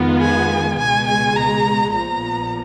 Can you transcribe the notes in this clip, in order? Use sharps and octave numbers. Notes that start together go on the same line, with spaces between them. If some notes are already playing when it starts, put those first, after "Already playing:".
Already playing: F2 D#3 G#3 B3 F4
G#5
C#2 B2 G#3 G#5
G#5
A#5
A#1 A#2 F3 B3 A#5